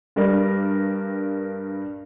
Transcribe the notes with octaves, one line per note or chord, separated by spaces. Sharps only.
G2 G3 A#4 D5